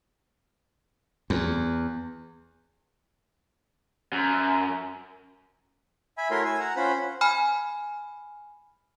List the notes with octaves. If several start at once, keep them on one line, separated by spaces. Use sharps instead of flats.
E2
F#2
E5 G#5 B5
A3 E4 F#4 A#4 C#5 C6
G#5 E6
F#5 A#5
C#4 F4 C5 F#5 B5
G#5 B5 F6